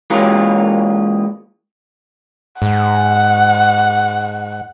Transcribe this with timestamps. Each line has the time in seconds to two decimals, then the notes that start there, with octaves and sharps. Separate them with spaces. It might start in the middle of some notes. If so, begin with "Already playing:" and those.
0.10 E3 G#3 A#3 C#4 F4 A#4
2.62 G#2 F#5